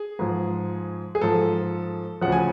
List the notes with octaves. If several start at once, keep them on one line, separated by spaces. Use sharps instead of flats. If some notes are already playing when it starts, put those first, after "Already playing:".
Already playing: G#4
G#2 F3
G#4
G#2 F3 A4
D2 C#3 F3 F#5
G#5